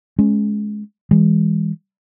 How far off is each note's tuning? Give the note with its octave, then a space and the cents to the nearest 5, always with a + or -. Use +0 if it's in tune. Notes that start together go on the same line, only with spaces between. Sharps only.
G#3 +15 C#4 +0
E3 -15 G#3 -40